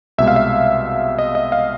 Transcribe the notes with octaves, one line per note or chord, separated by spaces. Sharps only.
C2 B2 G#3 E5
F5
E5
D#5
D#5
F5